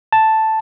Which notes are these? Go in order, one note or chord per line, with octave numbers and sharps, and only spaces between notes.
A5